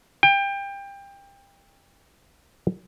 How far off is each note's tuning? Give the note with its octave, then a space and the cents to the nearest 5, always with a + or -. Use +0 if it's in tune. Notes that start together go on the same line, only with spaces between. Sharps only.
G5 +25